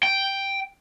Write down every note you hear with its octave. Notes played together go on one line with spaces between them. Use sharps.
G5